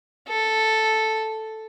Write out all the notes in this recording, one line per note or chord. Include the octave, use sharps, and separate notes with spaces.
A4